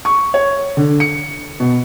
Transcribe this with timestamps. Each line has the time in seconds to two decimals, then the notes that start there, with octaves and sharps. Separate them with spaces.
0.05 C#6
0.34 C#5
0.77 D3
1.00 C#7
1.60 B2